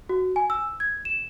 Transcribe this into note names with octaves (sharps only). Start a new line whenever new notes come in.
F#4
G#5
E6
G#6
E7